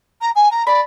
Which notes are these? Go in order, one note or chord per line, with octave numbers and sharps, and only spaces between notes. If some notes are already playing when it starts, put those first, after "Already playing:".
A#5
G#5
A#5
D5 B5